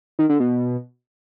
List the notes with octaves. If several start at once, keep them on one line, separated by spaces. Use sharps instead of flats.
D#3
D3
B2